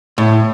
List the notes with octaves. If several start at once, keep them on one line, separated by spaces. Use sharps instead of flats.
A2